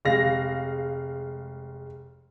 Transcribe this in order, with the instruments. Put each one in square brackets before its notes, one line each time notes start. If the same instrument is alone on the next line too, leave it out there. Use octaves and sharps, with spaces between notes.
[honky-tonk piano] F1 G#3 F5 A#6